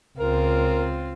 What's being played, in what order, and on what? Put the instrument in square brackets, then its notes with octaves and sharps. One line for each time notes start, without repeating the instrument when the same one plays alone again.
[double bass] C#2 [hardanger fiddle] C4 F4 [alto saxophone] A#4